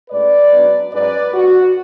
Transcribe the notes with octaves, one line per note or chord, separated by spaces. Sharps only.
A2 G#3 C#4 B4 D5
G#2 F#3 B3 D4
G#2 F#3 C#4 B4 D5
F#2 D3 G#3 B3 F#4